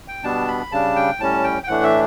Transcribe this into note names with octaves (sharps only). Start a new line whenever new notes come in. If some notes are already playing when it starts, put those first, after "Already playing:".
G5
B2 G3 B3 D4 A5
B5
C#3 G3 D4 A5
G5
A2 G3 C#4 A5
G5
G5
A2 E3 A3 D4 F#5
E5